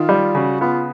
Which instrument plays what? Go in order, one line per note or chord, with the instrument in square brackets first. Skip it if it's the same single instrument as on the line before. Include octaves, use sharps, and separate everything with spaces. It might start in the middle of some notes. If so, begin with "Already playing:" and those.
Already playing: [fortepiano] D#3 [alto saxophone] F4
[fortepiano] G3
[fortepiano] C#3 [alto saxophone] F#4
[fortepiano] B3 [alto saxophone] F4